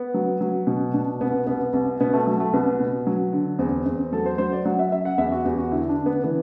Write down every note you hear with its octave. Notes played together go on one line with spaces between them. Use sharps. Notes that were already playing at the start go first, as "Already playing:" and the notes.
Already playing: B3
F#3
F#3
B2
B2 D4
C2 B3
C2 B3
C2
B2 B3
A3
F#3 A3
A3
C2 B3
B2
F#3
D3
E2 C4
E2 C4
F#3 A4
C5
F#3 C5
D5
F#3 F#5
E5
F#2 E5
F#5
E2 E5
F#4
E2 G4
F#4
D3 E4
D4
D3
B3
E3 B3